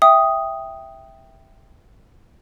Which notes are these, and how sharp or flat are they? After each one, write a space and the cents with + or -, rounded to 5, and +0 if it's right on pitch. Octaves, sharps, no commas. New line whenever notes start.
E5 +0 G5 +0 D#6 +0